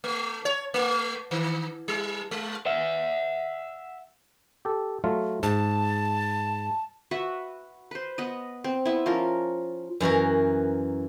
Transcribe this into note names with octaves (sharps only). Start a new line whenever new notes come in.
A3
C#5
A3
D#3
G3
G#3
E5 F#5
G4 A4
F#3 A3 F4
G#2 A5
F#4 B4 E5 F#5
B4 C5
B3 B4 D#5
C4
B3 E4
F3 C#4 F4 A#4
F#2 E3 F#4 A#4